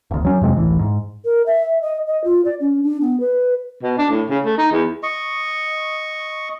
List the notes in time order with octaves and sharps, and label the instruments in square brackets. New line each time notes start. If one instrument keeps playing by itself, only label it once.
[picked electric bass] E1 D2
F#3 C#4
F2 C3 G#3 C4
D1 A1 A2 E3
G#2
[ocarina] A#4
E5
D#5
D#5
F4
D5
C#4
D4
B3
B4
[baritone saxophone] B2
D4
A2
C#3
A3
D#4
E2
[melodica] D#5 C#6